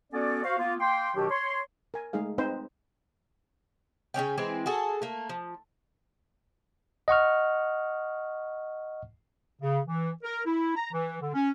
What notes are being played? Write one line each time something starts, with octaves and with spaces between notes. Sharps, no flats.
B3 C#4 F#4 A4 D5
F#4 C5 F5
A#3 B3 F4
A#3 G5 C6
B2 D#3 F#3 D4 G4
C#5 C6
A#4 G#5
G#3 A3 D#4 G#4 F5
C4 D#4 B4 C5
C#3 G#3 C#4 G5
E3 G#3 C4 E4
F#4 G#4 A4
A3 A#3
F3
D#5 F#5 C#6 F6
C#3
E3
A#4
E4
A#5
E3
D3
C#4